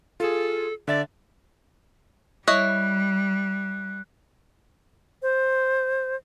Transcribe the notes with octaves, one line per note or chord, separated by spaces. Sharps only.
F4 G#4 A4
D3 D5 E5 A6
G3 E4 C#5 D#5 F#6
C5